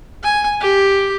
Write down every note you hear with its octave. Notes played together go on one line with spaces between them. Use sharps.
G#5
G4